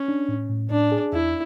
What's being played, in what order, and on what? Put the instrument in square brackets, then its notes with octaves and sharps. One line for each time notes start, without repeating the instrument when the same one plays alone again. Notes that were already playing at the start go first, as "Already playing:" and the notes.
Already playing: [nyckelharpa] C#4
[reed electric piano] D4
A2
A2
[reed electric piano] A2 [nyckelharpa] D4
[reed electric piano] G#4
[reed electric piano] E2 [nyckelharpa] E4